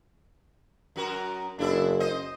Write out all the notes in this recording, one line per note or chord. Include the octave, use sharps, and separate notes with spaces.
F#2 F#4 A#4
F#1 D4 E4 E5
C5 D#5